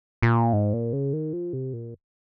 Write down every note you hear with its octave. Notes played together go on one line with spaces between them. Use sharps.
A#2
G#2
A#2
C#3
D#3
F3
C3
A#2